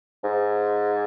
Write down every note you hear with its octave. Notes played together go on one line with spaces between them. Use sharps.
G#2